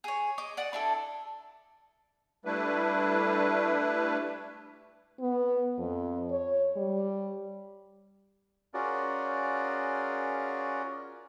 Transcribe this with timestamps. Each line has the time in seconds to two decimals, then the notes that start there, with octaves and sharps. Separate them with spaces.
0.04 G#4 C#5
0.38 D#5 D6
0.57 D5 F#5
0.73 D4 E4 A4
2.45 G3 A3 D4 E4 B4
5.20 B3
5.79 F2
6.30 C#5
6.77 G3
8.74 C#4 F4 F#4 G#4 A#4 D5